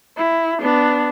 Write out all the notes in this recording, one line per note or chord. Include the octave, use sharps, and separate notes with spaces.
E4
B3 D4